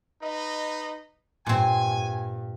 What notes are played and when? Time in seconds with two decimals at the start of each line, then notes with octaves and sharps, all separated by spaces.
0.22 D#4 B4 D#5
1.46 G2 A#2 C4 G#5